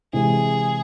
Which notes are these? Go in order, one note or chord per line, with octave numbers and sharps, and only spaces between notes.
C3 E3 G#3 G#4